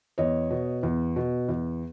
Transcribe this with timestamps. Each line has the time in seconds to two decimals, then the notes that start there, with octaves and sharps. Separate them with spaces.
0.18 E2 C#5 D#5
0.51 B2
0.83 E2
1.16 B2
1.48 E2